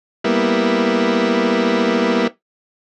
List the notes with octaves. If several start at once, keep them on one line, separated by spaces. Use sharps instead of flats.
G3 A#3 B3 E4